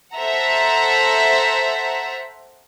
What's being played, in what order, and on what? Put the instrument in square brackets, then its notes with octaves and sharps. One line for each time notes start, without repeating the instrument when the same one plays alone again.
[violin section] A4 C5 E5 F#5 A#5